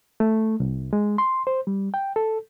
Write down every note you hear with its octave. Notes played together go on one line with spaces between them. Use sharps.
A3
C2
G#3
C6
C5
G3
G5
A4